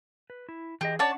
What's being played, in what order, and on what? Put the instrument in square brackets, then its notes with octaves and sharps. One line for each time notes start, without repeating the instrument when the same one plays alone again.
[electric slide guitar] B4
E4
[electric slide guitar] E3 G#4 D#5 [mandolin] G4
[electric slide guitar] C#4 D4 F#5 [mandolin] C#5 D5 A5